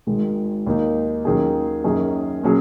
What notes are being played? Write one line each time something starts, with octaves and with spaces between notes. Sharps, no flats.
G#1 G#2 D#3 G#3
D#2 D#3 A#3 D#4
D#2 D#3 F#3 C#4 G#4
F#2 D#3 A#3 C#4 G#4
A#2 F#3 C#4 G#4